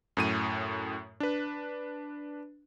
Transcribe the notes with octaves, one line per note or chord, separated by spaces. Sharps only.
F#2 A2 D#7
D4 B4